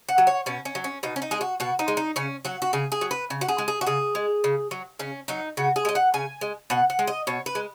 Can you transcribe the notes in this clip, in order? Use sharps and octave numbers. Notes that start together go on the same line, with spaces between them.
F#5
F#3
C#5
B2 C#4
C#4
F#3
C#4
B2 D#4
C#4
D#4
G#3 G#4
F#4
B2 F#4
D#4
G#3
D#4
C#3 C#4
F#3 F#4
F#4
C#3 G#4
G#4
F#3
B4
C#3
F#4
G#4
G#3
G#4
F#4
C#3 G#4
G#3
C#3
F#3
C#3 C#4
F#3 D#4
C#3 F#4
G#4
G#3 D#5
F#5
C#3 G#5
G#3
B2 F#5
F#5
G#3
D#5
B2 C#5
B4
G#3